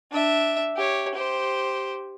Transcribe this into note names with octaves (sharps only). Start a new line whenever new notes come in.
D4 E5
G4 C#5
G4 C5